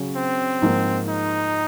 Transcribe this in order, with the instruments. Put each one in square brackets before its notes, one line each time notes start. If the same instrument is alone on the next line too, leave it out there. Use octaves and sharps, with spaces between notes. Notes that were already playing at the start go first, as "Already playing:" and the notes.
Already playing: [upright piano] C#3 F#3 C#4
[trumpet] C4
[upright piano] G#2 F3 A#3
[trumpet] D#4